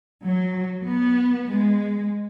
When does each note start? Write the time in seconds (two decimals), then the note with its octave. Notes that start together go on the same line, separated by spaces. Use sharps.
0.22 F#3
0.85 B3
1.51 G#3